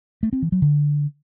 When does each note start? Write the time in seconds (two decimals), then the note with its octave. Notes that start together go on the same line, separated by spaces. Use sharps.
0.23 A3
0.33 C4
0.42 E3
0.52 F#3
0.62 D3